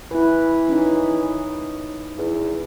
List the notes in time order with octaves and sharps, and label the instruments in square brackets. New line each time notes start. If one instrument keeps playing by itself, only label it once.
[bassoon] E3 [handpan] E4 B4
[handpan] C#4 D#4
[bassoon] E2